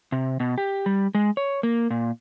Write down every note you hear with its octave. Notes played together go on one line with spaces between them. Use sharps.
C3
B2
G4
G3
G#3
C#5
A#3
A#2